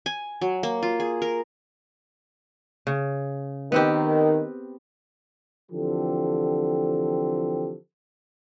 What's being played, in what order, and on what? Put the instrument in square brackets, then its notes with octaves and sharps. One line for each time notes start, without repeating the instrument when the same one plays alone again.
[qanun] G#5
F#3
A#3
F4
G#4
A#4
[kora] C#3
[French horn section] D#3 [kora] B3 C4 G4
[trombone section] D3 E3 F3 C4 G4 A4